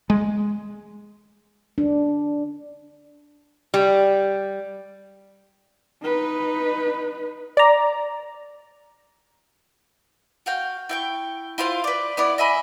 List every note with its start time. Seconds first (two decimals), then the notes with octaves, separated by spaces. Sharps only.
0.10 G#3
1.78 D4
3.74 G3
6.02 D#4 B4
7.57 D5 A#5
10.46 F#4 F5 G5
10.89 E4 G5 C#6
11.58 E4 F4 C5 F5
11.84 B4 D5
12.17 B3 E4 D5
12.38 D#5 E5 G#5 B5